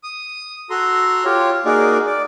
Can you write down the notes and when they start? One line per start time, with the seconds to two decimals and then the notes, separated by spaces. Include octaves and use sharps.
0.03 D#6
0.70 F#4 A4 A#5 C6
1.25 F4 G4 C#5
1.65 A#3 D#4 F#4 G#4 A#4 D5
2.06 D5